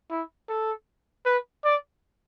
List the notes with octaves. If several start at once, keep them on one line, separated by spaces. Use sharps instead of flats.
E4
A4
B4
D5